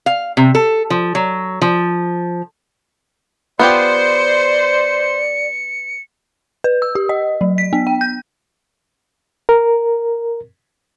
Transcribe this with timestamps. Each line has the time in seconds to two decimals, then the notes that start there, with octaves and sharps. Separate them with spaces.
0.06 F5
0.37 C3
0.55 A4
0.90 F3
1.15 F#3
1.62 F3
3.59 B3 F4 G4 C5 D5 C#7
6.64 B4
6.82 E6
6.95 G4
7.09 D#5
7.41 F#3
7.58 B6
7.73 B3
7.87 G5
8.01 G6
9.49 A#4